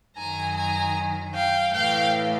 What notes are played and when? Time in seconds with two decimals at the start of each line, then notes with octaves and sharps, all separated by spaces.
0.18 F#2 D#3 F#3 G#5 A#5
0.57 G#5 A#5
1.34 F5 G5
1.73 A2 E3 A3 F5 G5